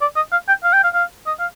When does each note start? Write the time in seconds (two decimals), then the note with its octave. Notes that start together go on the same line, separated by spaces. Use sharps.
0.01 D5
0.16 D#5
0.32 F5
0.48 G5
0.64 F5
0.73 G5
0.84 F5
0.94 F5
1.26 D#5
1.39 F5